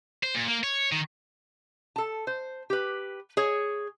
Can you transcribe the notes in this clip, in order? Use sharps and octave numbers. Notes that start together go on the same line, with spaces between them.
C5
A#2
A#3
C#5
D#3
A4 A5
C5
G4 B4
G#4 C#5